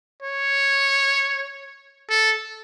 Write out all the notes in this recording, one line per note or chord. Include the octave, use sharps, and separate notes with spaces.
C#5
A4